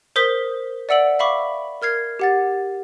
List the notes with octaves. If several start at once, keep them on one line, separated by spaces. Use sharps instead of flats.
A#4 C5 D#6 G6 B6 G7
D5 E5 F#5 E6 D7 F#7
E5 F5 B5 C#6 D6
A#4 F6 G#6 C7
G4 F#5 A6